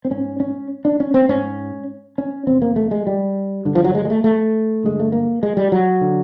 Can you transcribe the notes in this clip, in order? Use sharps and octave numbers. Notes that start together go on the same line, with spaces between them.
C4
G#2 C#4
C#4
D4
C#4
C4
G#2 C#4
C#4
E2 C3 C4
A#3
A3
G#3
G3
G2 D3
F3
F#3
G#3
G#3
A3
A3
G2 D3 G#3
A3
A#3
G#3
G3
F#3
D3